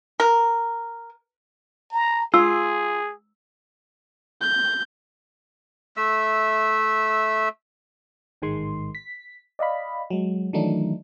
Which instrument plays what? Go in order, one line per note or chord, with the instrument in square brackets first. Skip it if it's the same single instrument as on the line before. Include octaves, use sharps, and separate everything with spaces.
[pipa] A#4
[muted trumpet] A#5
[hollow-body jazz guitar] F4 [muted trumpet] G#4 [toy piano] E6
[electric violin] G6
[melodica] A3 E5 E6
[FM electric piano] A1 G#2 D#3 G#3 C6
B6
D5 D#5 F5 B5
F#3 G#3
D#3 E3 F#3 A3 D4 D#4